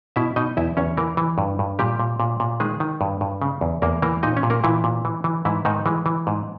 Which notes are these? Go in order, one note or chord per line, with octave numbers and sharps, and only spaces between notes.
B2 E4 E5
B2 D#4 D#5
E2 E4 E5
E2 C#4 C#5
E3 A#3 A#4
E3
G2
G2
A#2 G3 G4
A#2
A#2
A#2
D#3 G#3 G#4
D#3
G2
G2
C#3
E2
E2 A#3 A#4
E3 A#3 A#4
A#2 D#4 D#5
C#4 C#5
A#2
A#3 A#4
A#2 E3 E4
A#2
E3
E3
G#2 E3 E4
G#2 D#3 D#4
E3 G#3
E3
G#2